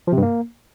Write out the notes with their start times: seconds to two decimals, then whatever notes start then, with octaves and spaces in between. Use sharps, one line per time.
0.07 F3
0.12 C3
0.17 G2
0.22 A#3